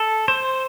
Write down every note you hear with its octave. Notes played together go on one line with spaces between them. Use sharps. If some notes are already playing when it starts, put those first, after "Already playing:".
Already playing: A4
C5